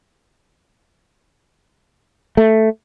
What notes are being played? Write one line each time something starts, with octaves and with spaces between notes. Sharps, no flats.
A3